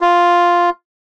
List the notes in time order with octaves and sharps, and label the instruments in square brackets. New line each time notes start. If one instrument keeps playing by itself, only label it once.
[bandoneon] F4